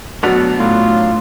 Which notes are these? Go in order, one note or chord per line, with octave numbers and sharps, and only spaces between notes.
B2 F#3 A3 B3 D4 F7
A2 F#3 D4 F4